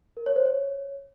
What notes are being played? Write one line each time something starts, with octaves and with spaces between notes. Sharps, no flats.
A#4
C#5
C5
C#5